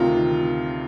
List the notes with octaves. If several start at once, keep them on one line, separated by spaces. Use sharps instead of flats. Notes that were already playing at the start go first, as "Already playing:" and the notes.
Already playing: D2 C3 D#3 F4